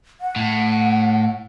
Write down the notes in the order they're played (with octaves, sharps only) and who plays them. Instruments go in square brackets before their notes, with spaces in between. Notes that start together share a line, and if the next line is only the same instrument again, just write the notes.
[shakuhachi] F#5
[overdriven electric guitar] A2